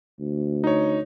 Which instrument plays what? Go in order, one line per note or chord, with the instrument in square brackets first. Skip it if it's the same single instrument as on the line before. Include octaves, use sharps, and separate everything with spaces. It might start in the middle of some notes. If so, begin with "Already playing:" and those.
[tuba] D2
[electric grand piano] D#4 C#5